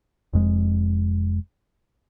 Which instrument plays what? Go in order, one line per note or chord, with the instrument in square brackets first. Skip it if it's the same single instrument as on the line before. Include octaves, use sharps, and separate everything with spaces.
[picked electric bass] F1 F2 G#3